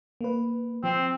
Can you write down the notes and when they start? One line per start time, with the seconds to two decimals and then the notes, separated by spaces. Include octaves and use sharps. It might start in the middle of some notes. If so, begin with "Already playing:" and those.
0.21 A#3 B4
0.84 F3 C4